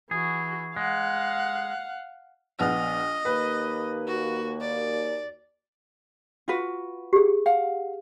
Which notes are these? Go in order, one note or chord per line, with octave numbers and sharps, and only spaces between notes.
E3 F#4 G#4
G#3 F5 F#5
A#1 B3 D#5 F6
D#2 A#3 B4
F#4
D5
F4 F#4 B4
G4 G#4
F5 F#5